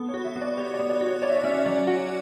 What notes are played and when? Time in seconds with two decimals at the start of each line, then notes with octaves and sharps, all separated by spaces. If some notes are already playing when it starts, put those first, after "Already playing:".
Already playing: B3 A4
0.09 C#5
0.14 F#4
0.25 E5
0.36 B3
0.41 D5
0.57 G4 C#5
0.74 D5
0.79 B3
0.90 D5
1.01 F#4
1.06 C#5
1.22 C#5 D5
1.30 E5
1.36 D5
1.44 C#4 E5
1.51 D5
1.58 E5
1.66 F#3 D5
1.87 F#4 F#5